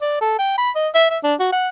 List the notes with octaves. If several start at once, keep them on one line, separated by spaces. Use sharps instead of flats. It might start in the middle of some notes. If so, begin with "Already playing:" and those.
D5
A4
G5
B5
D#5
E5
E5
D4
F#4
F#5